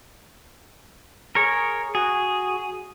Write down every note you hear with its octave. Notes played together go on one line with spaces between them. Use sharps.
G#4 A#4 C#5
F#4 G#4